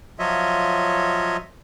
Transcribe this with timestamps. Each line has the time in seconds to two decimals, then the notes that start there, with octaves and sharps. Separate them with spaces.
0.19 F3 F#3 F4 C#5 D#5 E5